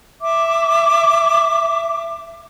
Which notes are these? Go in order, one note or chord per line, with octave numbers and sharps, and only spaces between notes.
E5 D6